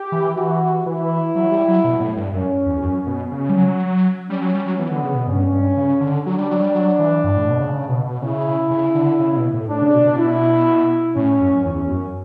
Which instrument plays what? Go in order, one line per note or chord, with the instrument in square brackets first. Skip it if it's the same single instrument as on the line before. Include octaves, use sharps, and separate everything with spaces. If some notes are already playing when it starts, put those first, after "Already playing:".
Already playing: [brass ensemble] G4
[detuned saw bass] E3
[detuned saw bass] E3 [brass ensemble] F#4
[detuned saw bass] E3 [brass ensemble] E4
[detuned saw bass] F#3
G3
F#3
B2
A2
G2
[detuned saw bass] F#2 [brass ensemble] C#4
[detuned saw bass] E2
F#2
B2
[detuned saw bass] C#3 [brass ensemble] C#4
[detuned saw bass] G3
F#3
[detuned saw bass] G3 [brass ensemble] C#4
[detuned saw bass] F#3
G3
F#3
[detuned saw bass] E3 [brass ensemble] B3
[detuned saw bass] D3
C#3
B2
[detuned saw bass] G2 [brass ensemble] C#4
[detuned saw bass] G2
C#3
D3
[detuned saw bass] F#3 [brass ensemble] D4
[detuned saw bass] G3
F#3
G3
F#3
E3
G2
A2
B2
C#3
C#3
B2
B2
[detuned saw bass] C#3 [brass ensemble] E4
[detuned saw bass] C#3
D3
C#3
C#3
B2
A2
[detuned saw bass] A2 [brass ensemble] D4
[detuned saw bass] C#3
B2
B2
[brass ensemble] E4
[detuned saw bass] A2 [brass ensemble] C#4
[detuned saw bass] F#2
[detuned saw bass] E2 [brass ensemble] C#4
[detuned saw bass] F#2